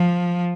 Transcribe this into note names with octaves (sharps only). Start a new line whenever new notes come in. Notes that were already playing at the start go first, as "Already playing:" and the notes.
Already playing: F3